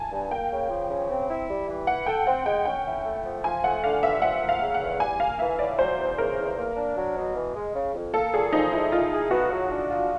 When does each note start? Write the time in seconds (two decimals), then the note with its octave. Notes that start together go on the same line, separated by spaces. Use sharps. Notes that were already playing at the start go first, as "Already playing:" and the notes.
Already playing: G#5 A5
0.11 G2
0.31 A#3 G5
0.51 C#3
0.70 F3
0.90 C#3
1.09 C4
1.29 E4
1.48 G3
1.67 E3
1.87 E4 F#5
2.06 A4 G5
2.26 C4 F#5
2.45 G#3 G5
2.65 C#4 G5
2.86 E4
3.05 A3
3.25 F3
3.44 F3 G#5
3.63 A3 F#5
3.83 D3 F5
4.03 G2 E5
4.22 F3 F#5
4.42 A#3
4.49 F5
4.62 C#3
4.74 F#5
4.81 E2
5.00 G3 G#5
5.20 A#3 F5
5.39 E3 E5
5.59 A2 D5
5.79 F#3 C5
5.98 E2
6.18 C#3 A#4
6.37 E2
6.57 A#3
6.76 D4
6.96 F#3
7.16 B2
7.36 E3
7.55 G#3
7.74 C#3
7.95 F2
8.14 A#3 A4
8.34 A#2 G#4
8.52 F3 D#4
8.72 A#2 E4
8.91 D#4 F4
9.12 G#4
9.31 B3 F#4
9.50 F#3
9.70 D4
9.90 F4